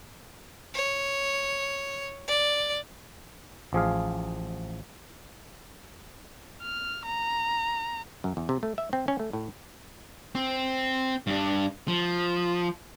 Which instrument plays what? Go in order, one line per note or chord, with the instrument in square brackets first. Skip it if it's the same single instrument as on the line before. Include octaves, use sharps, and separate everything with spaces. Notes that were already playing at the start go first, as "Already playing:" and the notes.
[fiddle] C#5
D5
[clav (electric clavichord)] A1 F3 G#4 F5
[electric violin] F6
A#5
[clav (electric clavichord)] F#2
E2
C3
A3
E5
C4
C#4
A3
A2
[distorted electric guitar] C4
G2 D4
F3